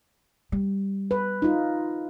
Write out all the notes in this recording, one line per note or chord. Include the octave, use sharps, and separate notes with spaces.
G3
B4
D#4 F4